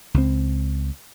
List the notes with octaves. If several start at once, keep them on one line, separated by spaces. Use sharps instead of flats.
C#2 C4